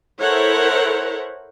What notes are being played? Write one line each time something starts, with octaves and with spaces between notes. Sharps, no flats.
E4 A4 A#4 C5 C#5 F#5